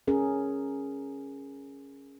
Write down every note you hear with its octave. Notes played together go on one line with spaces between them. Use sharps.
C#4 G#4 A#4